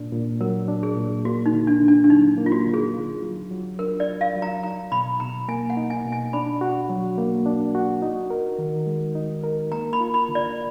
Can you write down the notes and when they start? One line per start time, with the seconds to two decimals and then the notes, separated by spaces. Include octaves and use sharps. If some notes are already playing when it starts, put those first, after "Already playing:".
Already playing: A#2 D4
0.12 A#2
0.41 F#3 A#4
0.68 D4
0.83 G#4
0.97 A#2
1.25 A#3 F#4
1.46 D#4
1.53 D3
1.67 D4
1.82 D3
1.88 D4
2.04 D4
2.10 F#3 D#4
2.38 A#3
2.46 F4
2.52 F#4
2.67 D3
2.74 G#4
2.94 F4
3.22 F#3
3.51 F#3
3.79 D4 A#4
4.00 D5
4.07 F4
4.21 F5
4.36 F#3
4.42 A#5
4.63 D#4 A#5
4.92 B2 B5
5.20 B2 A#5
5.48 A#3 G#5
5.70 F#5
5.77 D#4
5.90 G#5
6.05 B2
6.12 G#5
6.33 D4 B5
6.61 F#4
6.89 F#3
7.18 A#3
7.46 D4
7.75 F#4
8.02 D#4
8.30 A#4
8.59 D#3
8.86 G#3
9.15 D#4
9.44 A#4
9.72 A#3 A#5
9.93 B5
10.01 F4
10.14 B5
10.29 D3
10.35 D5